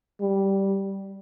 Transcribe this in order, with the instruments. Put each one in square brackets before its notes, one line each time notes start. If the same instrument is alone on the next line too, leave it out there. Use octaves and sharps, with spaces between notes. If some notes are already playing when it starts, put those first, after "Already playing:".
[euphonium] G3